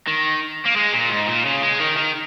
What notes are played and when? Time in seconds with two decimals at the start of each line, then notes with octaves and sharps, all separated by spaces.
0.08 D#3
0.66 A#3
0.76 G#3
0.94 A#2
1.11 G#2
1.28 A#2
1.46 C#3
1.62 G#3
1.80 D#3
1.97 D#3